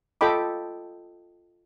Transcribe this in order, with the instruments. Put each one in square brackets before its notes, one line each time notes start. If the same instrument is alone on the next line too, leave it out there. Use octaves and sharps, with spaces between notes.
[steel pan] F4 A4 D#5 G5 B5 D6